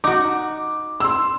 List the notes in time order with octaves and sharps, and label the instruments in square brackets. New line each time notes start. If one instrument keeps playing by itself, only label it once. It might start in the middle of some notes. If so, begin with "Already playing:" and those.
[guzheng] D#4 F#4 [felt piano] D6
[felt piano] C6 E6